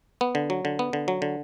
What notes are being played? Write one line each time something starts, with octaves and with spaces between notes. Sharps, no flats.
B3
D3
F#3
D3
B3
D3
F#3
D3